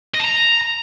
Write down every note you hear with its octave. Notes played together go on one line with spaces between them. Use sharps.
D#5
A5
A#5